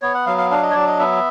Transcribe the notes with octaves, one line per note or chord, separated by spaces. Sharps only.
B3 C#5
F#5
F#3 F5
F5
D4 F5
D#5
C#5
F#3 D5
D#5
B3 E5